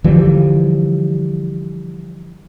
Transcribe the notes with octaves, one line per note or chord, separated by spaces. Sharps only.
D3 E3 F3 G3